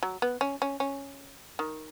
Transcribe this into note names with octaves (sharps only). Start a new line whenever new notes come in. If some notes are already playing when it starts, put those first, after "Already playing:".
F#3
B3
C#4
C#4
C#4
D#3